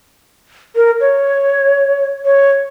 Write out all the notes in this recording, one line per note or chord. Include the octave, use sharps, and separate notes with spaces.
A#4
C#5
C#5